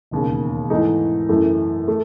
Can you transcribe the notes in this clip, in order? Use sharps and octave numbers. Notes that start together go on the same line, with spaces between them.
E1 D#2 C#3
G#2 E3 A3 D#4
F#2 E3 A3 E4
A3